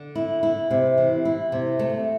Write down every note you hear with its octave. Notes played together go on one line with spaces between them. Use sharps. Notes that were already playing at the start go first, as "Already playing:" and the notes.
Already playing: D3
E4
E4
C3
E3
E4
C3
A3